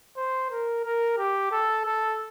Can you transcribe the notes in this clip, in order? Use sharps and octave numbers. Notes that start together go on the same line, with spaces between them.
C5
A#4
A#4
G4
A4
A4